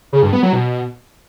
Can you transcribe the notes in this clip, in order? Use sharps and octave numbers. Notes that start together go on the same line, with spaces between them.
C#3
G2
B3
F#3
B2